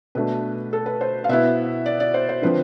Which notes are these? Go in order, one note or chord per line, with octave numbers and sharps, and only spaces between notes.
B2 A3 D4 B4
A4
B4
C5
F5
B2 B3 E4 E5
D5
D5
C5
C5
D3 F3 C4 B4